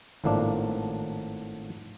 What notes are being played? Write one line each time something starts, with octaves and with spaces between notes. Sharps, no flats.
G#1 A2 F3 A#3 D4